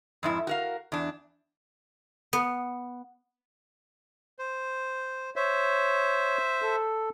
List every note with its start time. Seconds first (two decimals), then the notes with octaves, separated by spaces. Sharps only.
0.23 F2 G#2 E4
0.47 F#4 A#4 F5
0.92 E2 D4
2.33 B3
4.39 C5
5.36 C5 C#5 E5
6.62 A4